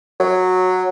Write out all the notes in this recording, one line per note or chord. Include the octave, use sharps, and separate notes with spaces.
F#3